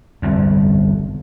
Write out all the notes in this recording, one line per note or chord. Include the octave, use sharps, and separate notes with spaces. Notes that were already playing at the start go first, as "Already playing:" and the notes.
G1 C2 F2